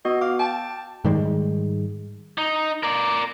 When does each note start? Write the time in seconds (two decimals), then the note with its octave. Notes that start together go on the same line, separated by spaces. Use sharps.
0.05 B3 F#4 D#5
0.21 F5 D6
0.39 G5 A5
1.05 G#2 D#3 G3 G#3
2.38 D#4
2.83 A#4 D5